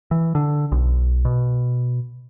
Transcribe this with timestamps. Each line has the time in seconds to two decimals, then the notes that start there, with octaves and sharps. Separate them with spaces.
0.11 E3
0.35 D3
0.72 B1
1.25 B2